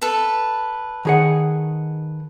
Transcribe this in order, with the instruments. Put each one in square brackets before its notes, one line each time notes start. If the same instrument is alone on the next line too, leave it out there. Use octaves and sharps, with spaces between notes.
[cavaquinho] A4 B4
[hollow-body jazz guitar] D#3 G#4 F#5